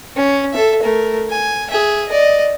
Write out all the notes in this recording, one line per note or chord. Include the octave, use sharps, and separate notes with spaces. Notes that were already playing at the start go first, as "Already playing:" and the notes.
C#4
A4 E5
A3 A#4
G#5
G#4 E5
D5 D#5